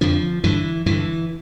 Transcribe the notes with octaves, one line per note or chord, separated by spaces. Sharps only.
F2 D3 F3
G2 D3 E3
G2 D3 E3